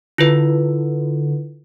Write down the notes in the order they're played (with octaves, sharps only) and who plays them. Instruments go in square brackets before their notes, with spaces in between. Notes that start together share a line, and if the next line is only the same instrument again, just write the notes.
[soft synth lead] D3 [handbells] E4 F4 B4